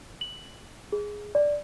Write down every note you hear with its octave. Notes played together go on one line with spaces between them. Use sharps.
F#7
G#4
D5